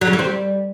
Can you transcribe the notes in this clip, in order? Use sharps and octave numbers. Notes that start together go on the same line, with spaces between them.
F#3
C#3
E3
C4
G3